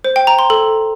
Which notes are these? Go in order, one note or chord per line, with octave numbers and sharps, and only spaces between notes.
C5
G5
A#5
C6
A4